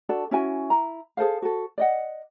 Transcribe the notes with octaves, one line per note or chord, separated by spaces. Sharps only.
D4 F#4 A4 D5
C#4 E4 F#4 G#5
E4 A#5
G#4 A4 C5 F5
F#4 A4
D5 D#5 F#5